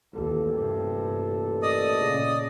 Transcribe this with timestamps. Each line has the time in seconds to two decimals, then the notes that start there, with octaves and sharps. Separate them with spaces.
0.14 A1 D#2 A#2 A4
0.54 G2 C3
1.62 D5 D#5 D#6
1.99 A#2 C#3